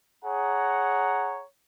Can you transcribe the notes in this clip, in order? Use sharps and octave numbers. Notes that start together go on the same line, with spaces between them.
G#4 C#5 F#5 A#5